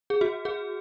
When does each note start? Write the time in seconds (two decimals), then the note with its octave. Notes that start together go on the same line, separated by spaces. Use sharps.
0.10 G#4
0.21 F#4
0.45 G#4